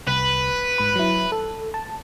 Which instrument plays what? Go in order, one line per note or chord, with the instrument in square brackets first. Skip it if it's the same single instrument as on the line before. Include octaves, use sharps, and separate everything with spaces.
[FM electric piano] C2 [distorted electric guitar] B4
[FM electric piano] G#2 B5
F#3 E4
A4
A5